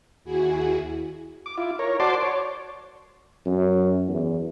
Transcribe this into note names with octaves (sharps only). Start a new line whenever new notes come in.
D#2 E4 F#4 G#4 G#5
D6
E4 F4
A#4 C#5
F#4 C5 D5 A5 C6 D6
C#5
F#2
E2